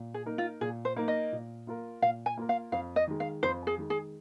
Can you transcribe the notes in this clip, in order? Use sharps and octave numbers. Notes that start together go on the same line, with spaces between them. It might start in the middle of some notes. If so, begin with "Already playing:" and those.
Already playing: A#2
G#4
A#3 D#4 A#4
F4
A#2 G#4
C5
A#3 D#4 A#4
D#5
A#2
A#3 F4 A#4
A#2 F5
G#5
A#3 F4 A#4
F5
F2 F5
D#5
D#3 G#3
F5
F2 C5
G#4
D#3 G#3
G#4